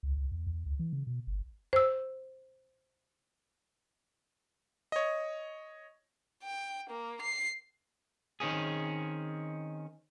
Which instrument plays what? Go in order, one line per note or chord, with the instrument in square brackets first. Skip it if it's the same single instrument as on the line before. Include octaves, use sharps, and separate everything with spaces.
[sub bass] C#2
C2
E2
E2
D2
E3
C#3
B2
G1
[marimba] C5 E6
[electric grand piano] C#5 D#5
[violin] G5
A#3
C7
[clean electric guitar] D#3 C4 C#4 G#4